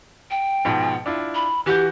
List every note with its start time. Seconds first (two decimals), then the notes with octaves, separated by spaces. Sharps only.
0.31 G5
0.65 G#2 B2 F3
1.06 D4 E4 F4
1.35 B5
1.66 E3 F#4 G4 G6